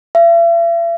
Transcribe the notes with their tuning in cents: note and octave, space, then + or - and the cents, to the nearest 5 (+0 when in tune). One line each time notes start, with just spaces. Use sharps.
E5 +45